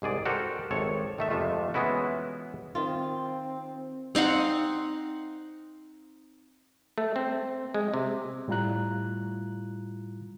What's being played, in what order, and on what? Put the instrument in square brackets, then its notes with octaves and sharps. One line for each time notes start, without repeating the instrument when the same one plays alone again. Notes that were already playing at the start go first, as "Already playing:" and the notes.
[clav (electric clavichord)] C2 G#2 G#4 D5
F#4 G4 A4 A#4 C5
G#1 C3 A4 C#5
D#3 A3 E5
F2 C3 G#3 A3 F4
E3 G#3 B3 C#4 E4 F#4
[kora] D#3 F4 [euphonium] C4
[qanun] C4 D#4 F5 F#5
[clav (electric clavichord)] A3
C4
G#3
C3
[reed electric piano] A2 G3 E4 F4 A#5 F#6